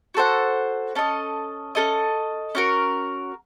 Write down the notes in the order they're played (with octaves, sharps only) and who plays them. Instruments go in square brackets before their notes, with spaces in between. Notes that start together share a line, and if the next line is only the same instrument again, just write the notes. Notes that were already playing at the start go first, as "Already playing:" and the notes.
[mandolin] F#4 A4 C5 F#5
C#4 A4 D#5
C#4 A4 D#5
C#4 F#4 A#4